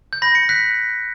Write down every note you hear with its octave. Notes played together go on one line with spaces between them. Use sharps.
G6
B5 A#6
C#7
F#6 B6